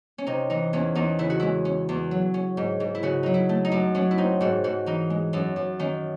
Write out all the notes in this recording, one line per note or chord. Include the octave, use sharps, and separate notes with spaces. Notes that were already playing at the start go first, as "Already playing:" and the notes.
C#4
C3 D#4
E3 D#4
E2 C#4
E2 D#4
C#3 E4
F#4
G#3 E4
C#4
E2
F#3
C#4
G#2
G#2
E4
C#3 F#4
F#3 D#4
E4
A3
D#4
F#2
F#3 C#4
E4
C4 D#4
G#2 F#4
G#2 F#4
E3 D#4
G#3
F#2 C#4
F#2
D#3 C#4